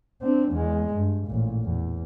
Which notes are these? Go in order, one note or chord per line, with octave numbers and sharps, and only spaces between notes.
C4 D4
E2 G#3
G2
A1 A#2
E2